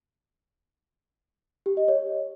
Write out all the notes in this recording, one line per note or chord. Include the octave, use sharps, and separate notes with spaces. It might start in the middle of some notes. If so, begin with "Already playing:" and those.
G4
D#5
C#5